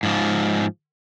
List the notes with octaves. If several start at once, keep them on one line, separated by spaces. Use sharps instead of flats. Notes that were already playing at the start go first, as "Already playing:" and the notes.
G#2 F3